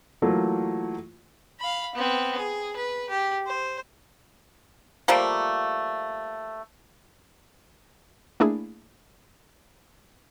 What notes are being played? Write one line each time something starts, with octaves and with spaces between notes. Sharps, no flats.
E3 F#3 A3 A#3 F4
F5 B5
B3 C4
G#4
B4
G4
C5
F3 G3 A3 A#3
A3 A#3 D4 E4 G#4